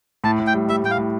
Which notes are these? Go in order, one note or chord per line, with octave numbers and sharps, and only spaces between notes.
A2 A5
A2
G5
G3
G3 E5
A2 G5
F5
A2